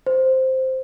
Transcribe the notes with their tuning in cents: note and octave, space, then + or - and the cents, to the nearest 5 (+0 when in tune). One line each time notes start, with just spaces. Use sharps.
C5 +0